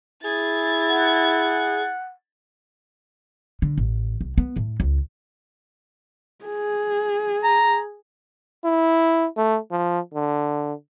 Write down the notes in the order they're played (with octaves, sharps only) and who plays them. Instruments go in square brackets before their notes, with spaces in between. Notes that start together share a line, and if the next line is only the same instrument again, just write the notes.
[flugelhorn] E4 [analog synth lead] G#4 [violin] G#6 A6
[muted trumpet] F#5
[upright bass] D3
A1
C2
B3
A2
C#2
[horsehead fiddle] G#4
[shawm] A#5
[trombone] E4
A3
F3
D3